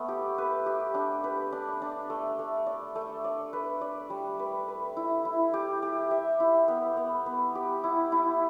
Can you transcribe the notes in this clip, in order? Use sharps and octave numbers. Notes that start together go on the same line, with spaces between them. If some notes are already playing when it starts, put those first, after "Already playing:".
Already playing: A3 B3
G4
B4
G4
D4
B4
D4
D4
A3
A3
D5
A3
D5
B4
D5
G3
B4
B4
E4
E4
G4
G4
E5
E4
B3
B3
B3
G4
E4
E4